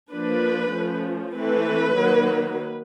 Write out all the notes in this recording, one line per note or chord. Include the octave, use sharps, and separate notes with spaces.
F3 A#3 D4 B4
F3 A3 C#4
E3 A3 C4 B4
D#3 F#3 A#3